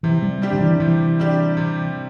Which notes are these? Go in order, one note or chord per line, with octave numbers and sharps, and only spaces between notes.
C3 E3
G3
G3 D4 G4
D3
E3
C3 E3
G3 D4 G4
C3